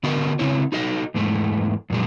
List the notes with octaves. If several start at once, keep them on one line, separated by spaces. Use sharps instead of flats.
D3 B3 F4 F#4 A#4 D#5
C#3 C4 C#4 E4 C#5
D#4 F#4 A4 D#5
E2 G#2 G#3 A3
F2 A#2 F#3 G#3